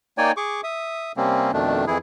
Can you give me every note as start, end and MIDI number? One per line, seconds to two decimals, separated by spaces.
0.18 0.32 58
0.18 0.32 63
0.18 0.32 73
0.18 0.32 74
0.18 0.32 79
0.18 0.32 80
0.37 0.61 68
0.37 0.61 85
0.37 0.61 86
0.64 1.12 76
0.64 1.12 87
1.17 1.51 48
1.17 1.51 55
1.17 1.51 58
1.17 1.51 60
1.17 1.51 61
1.53 1.85 41
1.53 1.85 47
1.53 1.85 51
1.53 1.85 57
1.53 1.85 62
1.87 1.98 41
1.87 1.98 52
1.87 1.98 64
1.87 1.98 68